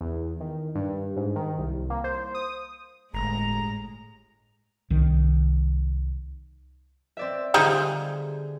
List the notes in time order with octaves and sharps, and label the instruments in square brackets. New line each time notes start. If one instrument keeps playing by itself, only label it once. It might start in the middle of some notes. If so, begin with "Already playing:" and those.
[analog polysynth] E2
D#3
G2
G#2
D#3
C2
A#3
C5
D#6
[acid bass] G1 [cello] A2 G#3 [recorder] A#5
[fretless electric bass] C2 D#3
[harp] C4 D5 E5
[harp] D3 G#4 [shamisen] F3 G3 D#4